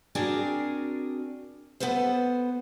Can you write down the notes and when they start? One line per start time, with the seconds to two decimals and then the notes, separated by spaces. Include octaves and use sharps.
0.15 C4 D4 F#4 G#4 A#4 D5
1.80 B3 A4 B4 C5